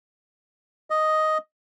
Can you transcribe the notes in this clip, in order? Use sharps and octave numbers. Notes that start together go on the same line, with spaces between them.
D#5